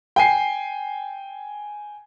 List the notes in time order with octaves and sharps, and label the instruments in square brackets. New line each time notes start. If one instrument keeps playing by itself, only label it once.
[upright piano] G5 G#5 C7